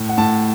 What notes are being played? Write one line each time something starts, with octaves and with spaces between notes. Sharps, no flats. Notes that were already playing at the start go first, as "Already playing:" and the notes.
Already playing: A2
F#5
A2 A5